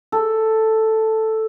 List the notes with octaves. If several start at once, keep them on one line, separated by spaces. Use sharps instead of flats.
A4